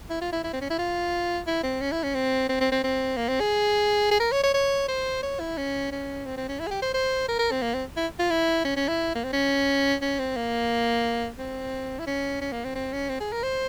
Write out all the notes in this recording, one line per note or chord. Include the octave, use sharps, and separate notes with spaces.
E4
F4
E4
E4
C4
C#4
E4
F4
E4
C4
C#4
E4
C#4
C4
C4
C4
C4
C4
A#3
C4
G#4
G#4
A#4
C#5
C#5
C#5
C5
C#5
E4
C#4
C#4
C4
C4
C#4
E4
G#4
G4
C5
C5
A#4
A#4
C4
A#3
C4
E4
F4
E4
C#4
C#4
E4
A#3
C4
C#4
C#4
C4
A#3
C4
E4
C#4
C#4
A#3
C4
C4
C#4
C4
G#4
A#4
C5